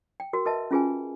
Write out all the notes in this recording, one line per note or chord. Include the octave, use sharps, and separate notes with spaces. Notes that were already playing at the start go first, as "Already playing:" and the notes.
G5
F#4 A#4
A#4 B4 D#5 E5 A5
C#4 F4 G#4 B4 G#5